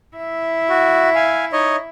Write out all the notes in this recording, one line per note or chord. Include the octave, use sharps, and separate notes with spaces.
E4 E5
F#4
F5 G#5
D#4 C#5 D#5